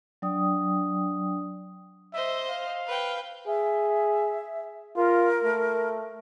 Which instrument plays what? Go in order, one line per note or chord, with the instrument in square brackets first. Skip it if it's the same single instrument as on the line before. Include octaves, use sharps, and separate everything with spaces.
[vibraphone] F#3 D4 D5 G5 D#6
[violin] C5 D#5 [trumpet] E5
[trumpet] F5
[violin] B4 G5
[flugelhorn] G#4 [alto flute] E5
[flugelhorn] F4 [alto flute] A#4
[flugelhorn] A3